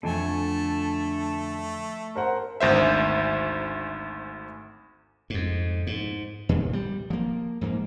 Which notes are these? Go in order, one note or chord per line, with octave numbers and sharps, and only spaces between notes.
F2 D3 A3 D4 G#5 A5
A#4 C5 F#5
G#1 D2 C5 E5
F2 G#2
G#2
D#2 A#2
G3
F3 A#3
G#2 A#3